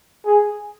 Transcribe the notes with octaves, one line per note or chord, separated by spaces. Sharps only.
G#4